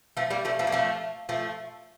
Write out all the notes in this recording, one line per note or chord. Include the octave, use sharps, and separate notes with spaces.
F3 A3
G3 A#3
F3 A3
F3 A3
A#3
F3 A3
F3 A3